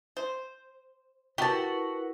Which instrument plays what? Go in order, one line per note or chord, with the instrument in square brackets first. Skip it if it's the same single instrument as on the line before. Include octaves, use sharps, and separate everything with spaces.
[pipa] C5
[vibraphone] E4 A#4 B4 [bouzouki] F#4 [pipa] G4 A5